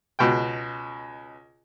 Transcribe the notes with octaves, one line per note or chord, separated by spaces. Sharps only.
C#2 B2 G5